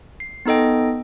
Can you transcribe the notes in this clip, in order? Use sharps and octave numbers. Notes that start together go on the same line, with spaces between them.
C7
B3 D#4 A4 D#5 G5